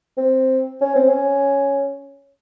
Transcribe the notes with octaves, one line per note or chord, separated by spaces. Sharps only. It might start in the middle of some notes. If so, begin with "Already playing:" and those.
C4
C#4
C4
C#4